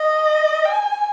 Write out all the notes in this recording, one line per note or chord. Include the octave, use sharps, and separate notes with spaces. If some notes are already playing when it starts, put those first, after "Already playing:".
Already playing: D#5
G#5